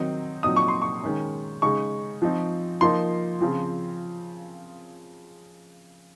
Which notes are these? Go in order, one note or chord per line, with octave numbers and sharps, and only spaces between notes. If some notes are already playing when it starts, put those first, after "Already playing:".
Already playing: D#3 F#3 C4 D#4
A#2 F#3 C4 D#4 D#6
C#6
C6
C#6
D#3 G#3 C#4
C#3 G#3 D#4 C#6
F3 C4 D#4
F3 A#3 D#4 C6
C#3 F3 C4